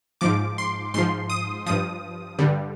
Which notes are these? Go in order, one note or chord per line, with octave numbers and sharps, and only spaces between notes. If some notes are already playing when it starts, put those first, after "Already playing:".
G#2 F3 D6
C6
G#2 F3 C6
D#6
G2 F3 D#6
G2 D3 G3